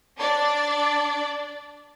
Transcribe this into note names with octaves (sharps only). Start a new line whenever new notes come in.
D4 D5